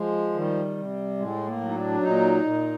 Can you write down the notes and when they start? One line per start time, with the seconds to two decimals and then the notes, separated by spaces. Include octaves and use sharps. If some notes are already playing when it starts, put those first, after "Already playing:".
Already playing: F3 G#3
0.35 D#3 G3
0.77 C3
1.18 A2 G#3
1.47 A#3
1.60 F#3
1.68 D#4
1.75 D4
2.02 A#2 D#4
2.44 A#2